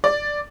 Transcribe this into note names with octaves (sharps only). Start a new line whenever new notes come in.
D5